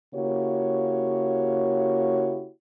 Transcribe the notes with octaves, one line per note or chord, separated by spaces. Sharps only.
C#3 A#3 E4 F#4 G4 C#5